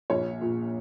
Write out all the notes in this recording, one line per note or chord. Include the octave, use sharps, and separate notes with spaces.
A#1 C#5
A#2